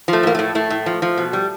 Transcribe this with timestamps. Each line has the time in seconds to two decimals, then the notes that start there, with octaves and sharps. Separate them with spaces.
0.08 F3
0.13 A3
0.23 A2 A#3
0.35 A2 A3
0.55 A2 A3
0.70 A2
0.86 F3
1.02 F3
1.17 B2
1.33 G3